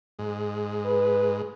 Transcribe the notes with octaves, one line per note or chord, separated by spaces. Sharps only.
G#2
B4